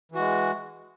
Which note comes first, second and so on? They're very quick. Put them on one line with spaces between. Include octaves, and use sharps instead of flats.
E3 F#4 G#3